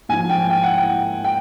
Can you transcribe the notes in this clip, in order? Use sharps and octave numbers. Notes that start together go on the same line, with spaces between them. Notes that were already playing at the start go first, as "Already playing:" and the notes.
G#2 F3 G#5
G5
G5
F#5
G5
G5